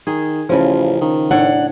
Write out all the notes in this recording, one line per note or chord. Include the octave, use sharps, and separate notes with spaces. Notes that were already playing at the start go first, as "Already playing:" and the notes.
D#3 G#4
A1 C#3 F3
D#3
A2 D4 C#5 F#5